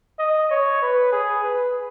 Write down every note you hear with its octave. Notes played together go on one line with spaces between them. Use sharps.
D#5
C#5
B4
G#4
B4